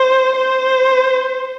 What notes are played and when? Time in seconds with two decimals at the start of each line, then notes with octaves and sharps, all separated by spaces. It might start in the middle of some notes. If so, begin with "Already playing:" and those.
Already playing: C5
0.35 C5